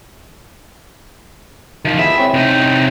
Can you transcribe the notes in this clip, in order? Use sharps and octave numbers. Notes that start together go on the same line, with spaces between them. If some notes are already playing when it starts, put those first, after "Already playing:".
D#3 F3
G#3 B3 E4 E5
C4 C#5 G5
C3 D#4